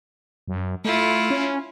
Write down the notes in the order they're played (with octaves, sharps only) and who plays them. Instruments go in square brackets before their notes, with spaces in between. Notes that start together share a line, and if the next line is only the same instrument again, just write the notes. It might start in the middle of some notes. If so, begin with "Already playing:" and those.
[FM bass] F#2
[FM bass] A3 [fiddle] E4 F4
[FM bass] C#4